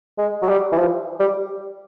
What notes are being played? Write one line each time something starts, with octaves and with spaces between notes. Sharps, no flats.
G#3
F#3
G3
E3
F3
G3